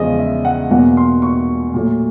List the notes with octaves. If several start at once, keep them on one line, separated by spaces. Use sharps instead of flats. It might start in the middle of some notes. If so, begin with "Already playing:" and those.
Already playing: E2 C#3 F3 G#3 D5 D#5
E5
F#5
E2 B2 F#3 A#3 F#5
C6
C#6
A#2 F#3 A3